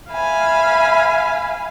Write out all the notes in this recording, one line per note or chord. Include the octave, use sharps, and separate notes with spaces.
E5 F5 G#5 B5